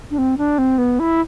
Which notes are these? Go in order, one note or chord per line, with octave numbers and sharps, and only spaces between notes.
D4
C4
D4
C4
B3
E4